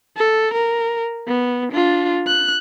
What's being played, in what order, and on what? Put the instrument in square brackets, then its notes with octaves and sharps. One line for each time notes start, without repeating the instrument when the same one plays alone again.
[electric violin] A4
A#4
B3
D4 F4
F#6